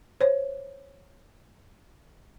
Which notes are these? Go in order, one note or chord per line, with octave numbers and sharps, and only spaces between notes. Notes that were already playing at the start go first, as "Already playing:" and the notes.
C5 C#5